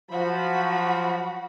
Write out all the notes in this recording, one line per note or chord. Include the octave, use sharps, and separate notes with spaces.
F3 F#3 F#4 B5